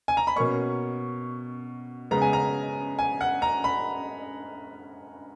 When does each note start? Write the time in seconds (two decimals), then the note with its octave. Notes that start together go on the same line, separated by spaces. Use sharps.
0.08 G#5
0.17 A#5
0.27 B5
0.36 B2 A#3 C#4 C#6
2.11 C#3 G#3 B3 A#5
2.22 G#5
2.33 A#5
2.99 G#5
3.21 F#5
3.42 A#5
3.64 B5